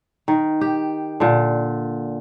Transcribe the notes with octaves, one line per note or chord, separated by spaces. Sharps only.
D#3
G4
A#2 D3